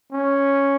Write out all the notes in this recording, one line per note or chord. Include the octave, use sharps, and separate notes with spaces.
C#4